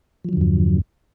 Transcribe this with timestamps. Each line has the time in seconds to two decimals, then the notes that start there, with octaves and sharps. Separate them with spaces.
0.25 F3
0.29 F#3
0.33 D3
0.37 E2
0.41 G2